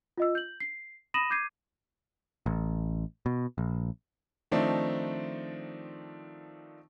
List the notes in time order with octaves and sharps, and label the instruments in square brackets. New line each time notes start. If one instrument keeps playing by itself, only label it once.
[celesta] F4 D#5 E6
G6 F#7
C7
B5 D#6 A#6 D#7 E7 F#7
D6 G6 G#6 C7 D#7
[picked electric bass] A1
B2
A#1
[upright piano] D#3 F3 A3 C4 D4 D#4